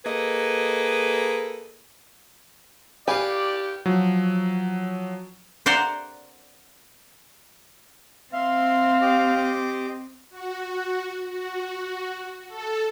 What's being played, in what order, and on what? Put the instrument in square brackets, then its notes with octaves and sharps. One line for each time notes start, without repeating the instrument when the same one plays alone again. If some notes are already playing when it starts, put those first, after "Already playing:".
[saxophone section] A#3 G#4 A4 B4 D#5
[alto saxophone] G4 [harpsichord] B4 F5 [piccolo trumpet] D5 [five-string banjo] G#5
[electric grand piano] F3 F#3
[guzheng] C5 D5 F#5 A#5 C6
[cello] C4 [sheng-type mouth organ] E5 C6 [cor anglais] F5
[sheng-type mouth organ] G4 D#5 D6
[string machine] F#4
F#4
A4